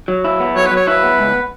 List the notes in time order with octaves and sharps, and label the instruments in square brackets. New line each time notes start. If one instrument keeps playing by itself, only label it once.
[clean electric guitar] F#3
E4
B3
[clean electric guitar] F#3 [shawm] C#5
[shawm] B4
[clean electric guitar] F#3 [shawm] C#5
[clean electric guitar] E4 [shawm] B4
[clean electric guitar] B3
C#2